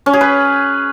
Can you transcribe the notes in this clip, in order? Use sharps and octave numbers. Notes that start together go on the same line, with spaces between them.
C#4
G#4
B4